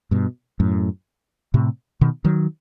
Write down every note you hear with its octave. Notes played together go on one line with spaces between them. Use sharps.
G2 B2
F#2 A2
A2 C3
B2 D#3
D#3 F#3